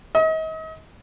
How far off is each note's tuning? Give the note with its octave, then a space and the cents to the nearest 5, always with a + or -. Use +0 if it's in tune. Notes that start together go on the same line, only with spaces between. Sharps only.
D#5 +40